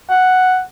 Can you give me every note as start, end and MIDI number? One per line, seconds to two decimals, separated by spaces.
0.10 0.62 78